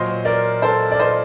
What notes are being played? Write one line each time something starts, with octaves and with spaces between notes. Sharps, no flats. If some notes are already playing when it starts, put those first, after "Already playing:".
Already playing: A#2 F#3 C5 D#5
A#4 D5
A4 C5
D5
C5 D#5